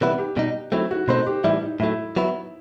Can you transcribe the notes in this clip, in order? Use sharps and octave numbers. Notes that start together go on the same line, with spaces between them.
C3 E3 G3 B3 E4 B4
G4
B2 G3 D#4
F#3 A3 C4 E4
F#4
B2 A3 C4 D#4 C5
G4
A2 E3 G3 E4
D#4
A2 F#3 A3 E4
F#3 B3 E4